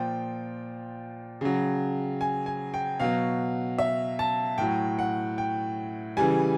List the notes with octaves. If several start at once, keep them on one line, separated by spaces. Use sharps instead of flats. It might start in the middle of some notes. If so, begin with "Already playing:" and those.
Already playing: A#2 F3 G5
C#3 F#3
G#5
G#5
G5
B2 F#3 F5
E5
A5
A2 F#3 G5
F#5
G5
C#3 E3 G3 G#5